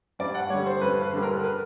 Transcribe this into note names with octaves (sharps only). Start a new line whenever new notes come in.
G2 D5
F#5
D3 G3 C#5
C5
G2 B4
B4
D3 G3
A#4
B4